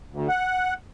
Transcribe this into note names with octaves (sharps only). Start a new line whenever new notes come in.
D2
F#5